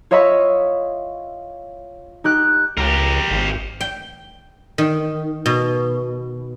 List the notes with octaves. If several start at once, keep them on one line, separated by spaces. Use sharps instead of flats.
F4 C#5 D#5 E5 B5 C#6
D#4 G4 F#6
C#2 G4 A#4
G#1
G5
D#3
B2